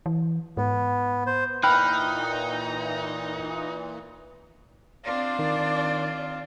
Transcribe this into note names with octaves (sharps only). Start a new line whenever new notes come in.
E3
G#2 B3
C5
A#2 E3 D#4 G5 B5 F6 F#6
C4 D4 F4 D5
D#3